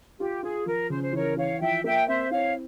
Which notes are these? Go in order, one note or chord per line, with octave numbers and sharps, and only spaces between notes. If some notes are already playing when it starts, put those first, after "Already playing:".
F4 G4
F4 G#4
F3 A#4
C#3 C5
C5
E3 A#4 C#5
E3 C#5 F5
F3 E5 G5
A#3 E5 G5
C4 C5 E5
E4 C#5 F5